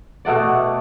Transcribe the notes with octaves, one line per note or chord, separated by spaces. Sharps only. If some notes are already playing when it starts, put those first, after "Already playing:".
B2 A3 F#4 D5